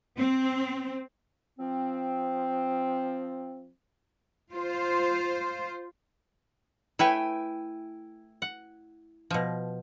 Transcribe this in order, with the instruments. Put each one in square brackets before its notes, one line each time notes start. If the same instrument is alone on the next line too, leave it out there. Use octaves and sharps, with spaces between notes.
[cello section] C4
[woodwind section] F3 C4
[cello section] F4 C5
[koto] A3 B4 C#5 [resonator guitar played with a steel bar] E4 G5 G#5
[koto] F#5
B2 F3